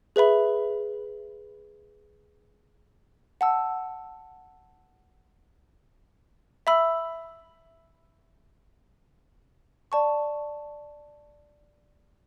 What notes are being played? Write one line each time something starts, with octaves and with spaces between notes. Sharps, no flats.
G#4 B4 E5 B5
F#5 A5 E6
E5 B5 E6
D5 A5 C#6